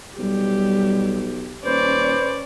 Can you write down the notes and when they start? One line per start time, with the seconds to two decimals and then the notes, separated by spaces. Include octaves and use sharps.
0.18 B1 G3 G4
1.65 D#1 C#4 B4 C5 D5